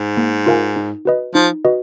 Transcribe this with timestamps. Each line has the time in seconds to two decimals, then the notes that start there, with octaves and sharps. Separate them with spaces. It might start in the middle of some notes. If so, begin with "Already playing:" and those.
Already playing: G#2
0.17 A#3
0.46 F4 A#4 F5 G#5
0.76 D#4
1.05 F#4 B4 D#5
1.35 F3 D#4
1.65 F#4 B4 D#5